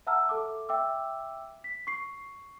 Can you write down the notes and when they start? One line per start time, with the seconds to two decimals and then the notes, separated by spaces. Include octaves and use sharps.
0.07 E5 F#5 A5 A#5 E6 F6
0.29 A4 E5 D6
0.69 E5 G5 D6 E6
1.64 B6
1.87 C#6 C7